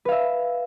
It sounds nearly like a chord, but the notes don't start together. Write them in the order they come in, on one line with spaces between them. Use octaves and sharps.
B4 F5 E5